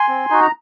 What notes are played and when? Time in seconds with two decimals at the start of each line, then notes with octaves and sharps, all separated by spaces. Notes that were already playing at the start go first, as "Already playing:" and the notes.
Already playing: G#5 C6
0.08 C4
0.30 D#4 F#4
0.42 A#5